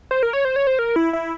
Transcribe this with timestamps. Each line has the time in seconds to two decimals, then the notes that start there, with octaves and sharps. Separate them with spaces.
0.11 C5
0.23 A#4
0.33 C#5
0.45 C5
0.56 C#5
0.67 C5
0.79 A#4
0.96 E4
1.13 E4